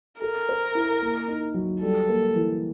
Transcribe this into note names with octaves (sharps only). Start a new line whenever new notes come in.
A4 A#4
C5
E4
A#3
D#4
F#3
G3 A4
A#3
E3